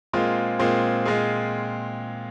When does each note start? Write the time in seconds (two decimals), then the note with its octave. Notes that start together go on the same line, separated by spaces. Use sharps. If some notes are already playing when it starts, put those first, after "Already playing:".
0.13 A#2 G#3 C4 F4 G#4
0.59 A#2 G#3 C4 F4 G#4
1.05 A#2 G#3 C4 F4 G#4